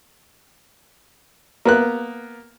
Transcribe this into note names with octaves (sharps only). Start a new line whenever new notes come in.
A#3 B3 F#6